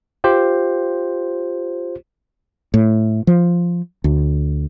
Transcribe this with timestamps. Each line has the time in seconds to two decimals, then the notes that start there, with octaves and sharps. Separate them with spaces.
0.24 F4 G4 C5
2.74 A2
3.27 F3
4.04 D2